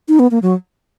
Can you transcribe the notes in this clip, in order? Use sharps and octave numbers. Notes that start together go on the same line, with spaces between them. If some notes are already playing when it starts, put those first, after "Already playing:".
D#4
B3
A#3
F#3